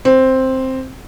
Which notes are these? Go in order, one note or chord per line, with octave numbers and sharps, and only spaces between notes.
C4